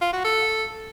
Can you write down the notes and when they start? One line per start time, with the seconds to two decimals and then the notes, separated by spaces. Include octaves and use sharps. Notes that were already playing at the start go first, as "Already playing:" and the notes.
0.01 F4
0.13 F#4
0.24 A4